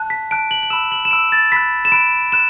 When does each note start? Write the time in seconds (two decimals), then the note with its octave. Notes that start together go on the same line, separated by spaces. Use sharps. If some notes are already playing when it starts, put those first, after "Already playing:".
Already playing: A5 F#6
0.10 B6
0.31 A5 F#6 D7
0.51 F#7
0.63 F#7
0.70 B5 E6 E7
0.92 F#7
1.05 E7
1.11 B5 E6 D7
1.32 A6
1.52 B5 F#6 B6
1.85 E7
1.92 B5 F#6 D7
2.32 B5 F#6 E7